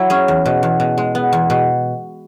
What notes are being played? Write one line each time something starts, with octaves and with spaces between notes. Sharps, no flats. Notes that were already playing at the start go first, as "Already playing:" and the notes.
Already playing: F#3 E4
C#4 G#4
E2
B2
E2
B2
G#3
B3
E2
B2